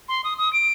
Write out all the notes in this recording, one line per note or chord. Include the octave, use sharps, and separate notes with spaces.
C6
D#6
D#6
D7